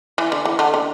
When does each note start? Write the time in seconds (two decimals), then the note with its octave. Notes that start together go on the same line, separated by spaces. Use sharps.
0.18 E3
0.32 D3
0.45 E3
0.59 D3
0.74 D3